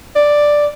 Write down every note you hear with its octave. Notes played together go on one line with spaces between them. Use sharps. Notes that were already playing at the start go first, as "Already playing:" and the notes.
D5